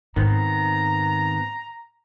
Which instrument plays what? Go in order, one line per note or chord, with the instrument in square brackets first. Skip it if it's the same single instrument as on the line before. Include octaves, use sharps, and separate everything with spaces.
[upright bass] G#2 [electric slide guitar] D#3 B3 C4 [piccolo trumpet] A#5